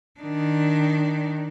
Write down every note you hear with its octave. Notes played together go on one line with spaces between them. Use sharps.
D#3 D4